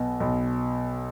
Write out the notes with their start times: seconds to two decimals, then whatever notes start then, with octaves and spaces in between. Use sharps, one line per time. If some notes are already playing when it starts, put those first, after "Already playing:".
Already playing: B1 B2
0.20 B1